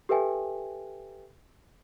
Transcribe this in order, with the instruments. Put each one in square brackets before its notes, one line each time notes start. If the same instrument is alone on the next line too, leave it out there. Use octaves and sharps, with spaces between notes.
[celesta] G4 A4 B4 E5 G5 G#5